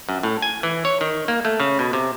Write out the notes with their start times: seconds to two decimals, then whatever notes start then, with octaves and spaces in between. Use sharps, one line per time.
0.09 F#2
0.23 A2
0.42 G#5
0.63 E3
0.85 C#5
1.01 D#3
1.28 A#3
1.45 A3
1.60 C#3
1.79 B2
1.93 C3